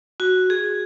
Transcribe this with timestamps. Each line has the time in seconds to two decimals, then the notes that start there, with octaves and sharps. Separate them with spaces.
0.20 F#4
0.50 G#4